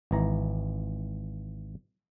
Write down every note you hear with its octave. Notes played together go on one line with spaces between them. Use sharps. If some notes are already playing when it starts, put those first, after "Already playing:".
G#1 E3 A#5